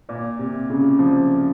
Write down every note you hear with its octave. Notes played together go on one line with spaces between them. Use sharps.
A#2
C3
C#3
F3